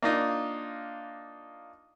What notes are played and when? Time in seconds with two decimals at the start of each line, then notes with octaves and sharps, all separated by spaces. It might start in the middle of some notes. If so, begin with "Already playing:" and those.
0.02 A#3 D4 D#4 F4